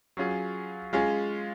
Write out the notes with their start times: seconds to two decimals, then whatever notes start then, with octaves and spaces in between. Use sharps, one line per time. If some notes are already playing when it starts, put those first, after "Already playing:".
0.17 F#3 C#4 F4 G#4
0.93 G#3 C#4 F4 G#4